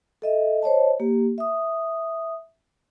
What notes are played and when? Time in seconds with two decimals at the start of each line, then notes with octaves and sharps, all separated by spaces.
0.22 A4 D#5 E5
0.62 C5 C#5 D#5 A5
1.00 A#3 G4
1.38 E5 D#6